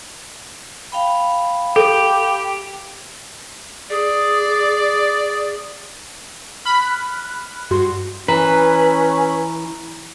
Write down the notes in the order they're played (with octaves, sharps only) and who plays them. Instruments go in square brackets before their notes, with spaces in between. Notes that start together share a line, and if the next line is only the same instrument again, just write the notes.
[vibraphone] F5 G5 B5
[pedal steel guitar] G4 [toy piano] A4
[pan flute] G#4 [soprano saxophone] D5
[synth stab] B5 [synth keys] F6 F#6
[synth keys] G2 F#4 C6
[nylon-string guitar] E3 [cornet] C#4 [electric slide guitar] B4 [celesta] A#5